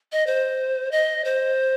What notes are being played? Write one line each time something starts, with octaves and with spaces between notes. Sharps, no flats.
D#5
C5
D#5
C5